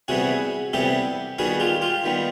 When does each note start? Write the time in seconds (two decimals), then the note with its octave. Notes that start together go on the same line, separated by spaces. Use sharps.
0.08 C3 E3 G3 B3 F#4 G#4
0.73 C3 E3 G3 B3 G4 A4
1.39 D#3 G3 B3 F#4 G#4
1.60 F4 G4
1.82 F4 G4
2.04 D#3 G3 B3